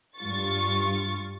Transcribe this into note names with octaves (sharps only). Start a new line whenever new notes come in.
G2 F4 C#6 A6